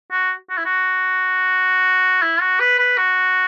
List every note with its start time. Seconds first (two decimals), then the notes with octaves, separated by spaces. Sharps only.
0.11 F#4
0.50 F#4
0.58 E4
0.65 F#4
2.22 E4
2.41 F#4
2.60 B4
2.79 B4
2.98 F#4